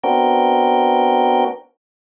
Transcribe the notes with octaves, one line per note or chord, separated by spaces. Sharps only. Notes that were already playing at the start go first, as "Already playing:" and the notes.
B3 C4 D4 F#4 A#4 G5